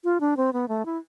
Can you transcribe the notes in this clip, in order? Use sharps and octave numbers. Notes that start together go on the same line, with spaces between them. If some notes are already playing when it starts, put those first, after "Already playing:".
F4
D4
C4
B3
A3
E4